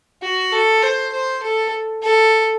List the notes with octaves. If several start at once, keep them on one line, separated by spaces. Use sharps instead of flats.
F#4
A4
C5
C5
A4
A4